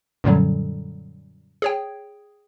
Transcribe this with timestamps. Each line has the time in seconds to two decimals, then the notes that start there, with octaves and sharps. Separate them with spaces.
0.24 F#2 A#2 D3 F#3 G3
1.62 G#4 C#5 G5